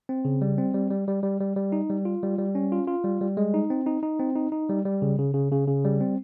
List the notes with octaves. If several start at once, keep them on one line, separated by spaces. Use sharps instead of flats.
C4
C#3
G3
C4
G3
G3
G3
G3
G3
G3
D#4
G3
F4
G3
G3
C#4
F4
F4
G3
G3
G#3
D#4
C4
D#4
D#4
C4
D#4
D#4
G3
G3
C#3
C#3
C#3
C#3
C#3
G3
C4